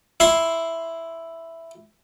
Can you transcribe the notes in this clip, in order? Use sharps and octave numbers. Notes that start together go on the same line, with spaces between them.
E4 C6